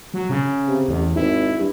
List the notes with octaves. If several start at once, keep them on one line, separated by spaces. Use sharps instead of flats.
F#3
C#3
C3
A1 E2
G#1 E4
G2